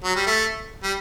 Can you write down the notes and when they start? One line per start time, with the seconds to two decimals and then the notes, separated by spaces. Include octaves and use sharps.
0.04 F#3
0.16 G3
0.27 A3
0.83 G3